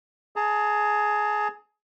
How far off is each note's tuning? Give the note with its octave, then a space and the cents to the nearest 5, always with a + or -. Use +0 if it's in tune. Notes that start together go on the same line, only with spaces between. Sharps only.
G#4 +15 A5 +45